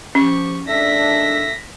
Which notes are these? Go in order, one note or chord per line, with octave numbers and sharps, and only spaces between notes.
F3 C#4 G4 C#6
D#3 G#3 D4 A4 E5 A#6 B6